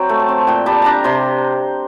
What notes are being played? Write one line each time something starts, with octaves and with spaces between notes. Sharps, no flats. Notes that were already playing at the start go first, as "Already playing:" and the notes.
Already playing: F#3 C4 G5
A3
A5
C4
A5
A#2 G5
G3 A5
D4 A5 A#5
C3 C6